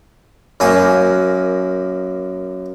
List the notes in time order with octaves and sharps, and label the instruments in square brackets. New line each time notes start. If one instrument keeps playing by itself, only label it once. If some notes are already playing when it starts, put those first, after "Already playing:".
[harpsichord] F#2 A#3 G#5 D#6